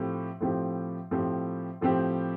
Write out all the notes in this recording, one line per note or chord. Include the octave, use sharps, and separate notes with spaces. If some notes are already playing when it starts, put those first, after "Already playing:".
Already playing: A2 F3 C4 G4
A2 F3 C4 G4
A2 F3 C4 G4
A2 F3 C4 G4